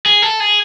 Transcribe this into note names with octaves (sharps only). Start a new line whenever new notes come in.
G#4
A4
G#4